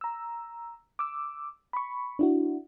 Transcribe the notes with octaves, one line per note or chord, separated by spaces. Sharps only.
A#5 E6
D6 E6
B5 C#6
D4 E4 F#4